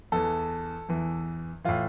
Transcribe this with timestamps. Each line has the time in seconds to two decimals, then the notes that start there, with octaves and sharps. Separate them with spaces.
0.12 E2 E3 A4
0.89 E2 E3
1.64 A2 E3 F4